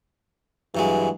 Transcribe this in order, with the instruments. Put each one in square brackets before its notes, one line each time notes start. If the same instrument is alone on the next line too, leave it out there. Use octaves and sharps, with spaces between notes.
[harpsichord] G2 F#3 G#3 [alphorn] E3